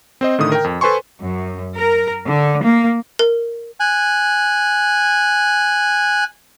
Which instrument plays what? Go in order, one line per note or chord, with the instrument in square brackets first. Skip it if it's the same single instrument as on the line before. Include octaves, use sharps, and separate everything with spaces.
[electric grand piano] C4 C5 D#5
A2 D3 D#3 D#6
A#4 G5
F2
A4 B4 C5 G#5 C6 C#6
[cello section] F#2
A#4
D3
A#3
[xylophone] A#4
[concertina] G#5 F#6